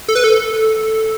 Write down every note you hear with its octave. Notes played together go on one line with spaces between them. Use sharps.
A4
B4
A4